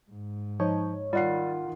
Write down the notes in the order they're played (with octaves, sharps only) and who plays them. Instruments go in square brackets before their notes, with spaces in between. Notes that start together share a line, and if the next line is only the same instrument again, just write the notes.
[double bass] G#2
[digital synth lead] F3 [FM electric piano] D#4 C#5
[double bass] D#3 [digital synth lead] G3 [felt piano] F4 F#5 C7